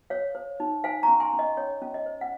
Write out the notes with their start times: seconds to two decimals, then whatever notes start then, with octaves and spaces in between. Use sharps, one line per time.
0.10 C5 C#5 F5
0.35 C5
0.60 D#4
0.84 C5 F5 G#5
1.03 A#5 C#6
1.08 C#4
1.20 G#5 C6
1.33 C#4
1.39 D#5
1.57 C#4 C#5
1.82 C#4
1.94 D#5
2.06 C5
2.21 F#5